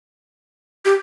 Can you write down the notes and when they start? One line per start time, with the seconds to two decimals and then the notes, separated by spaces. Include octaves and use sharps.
0.85 G4